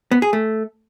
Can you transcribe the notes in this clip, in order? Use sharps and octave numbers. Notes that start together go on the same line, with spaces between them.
B3
G#4
A3